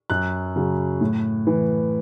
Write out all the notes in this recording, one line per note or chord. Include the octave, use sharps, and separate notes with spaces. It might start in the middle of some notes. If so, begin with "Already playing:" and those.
F#2 F#6
C#3 F#3
A2
E3